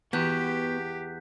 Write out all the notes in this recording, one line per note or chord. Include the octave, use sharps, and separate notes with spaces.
E2 B3 F#4 G4 F#6 G6 B6